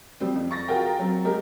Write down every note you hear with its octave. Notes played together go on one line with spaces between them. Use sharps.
F3 G3 C4
F2
C#6 A6 A#6
F4 F#4 G#4 A#4 G5 A#5
F#3 C4
G#3 G4 A#4